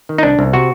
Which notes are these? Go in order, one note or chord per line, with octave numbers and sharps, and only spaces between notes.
D#3
D#4
C2 D4
C2
C3 F#4